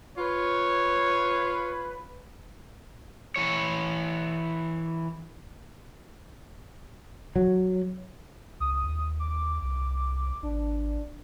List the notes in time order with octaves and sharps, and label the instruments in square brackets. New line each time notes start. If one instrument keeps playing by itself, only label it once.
[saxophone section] F4 B4 [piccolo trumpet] C#5
[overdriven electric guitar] E3 C#5
[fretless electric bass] F#3
[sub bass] C#2 [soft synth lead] D#6
[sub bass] D#2
[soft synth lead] D6
[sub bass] C2
[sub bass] G#1 [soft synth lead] D4